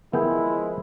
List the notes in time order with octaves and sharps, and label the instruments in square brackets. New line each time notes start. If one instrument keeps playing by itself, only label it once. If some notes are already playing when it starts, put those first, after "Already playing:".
[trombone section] F3 G#3 [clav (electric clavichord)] B3 G#4 G5 [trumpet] E4 [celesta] A#4